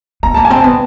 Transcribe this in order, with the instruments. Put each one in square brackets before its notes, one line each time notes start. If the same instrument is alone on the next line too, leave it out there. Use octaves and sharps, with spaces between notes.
[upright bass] B3 [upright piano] A#5
[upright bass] A#3 [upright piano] A5
[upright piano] G#5
[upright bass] C4
[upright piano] A5
[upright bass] B3